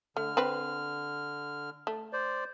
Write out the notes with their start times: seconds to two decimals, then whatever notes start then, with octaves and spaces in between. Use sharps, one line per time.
0.17 D3 A3 F6
0.37 C4 B4
1.87 A3
2.13 C5 D5